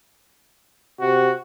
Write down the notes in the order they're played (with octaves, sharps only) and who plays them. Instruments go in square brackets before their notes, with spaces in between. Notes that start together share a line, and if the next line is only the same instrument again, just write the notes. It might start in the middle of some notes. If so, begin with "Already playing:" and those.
[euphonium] C3 [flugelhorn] F#4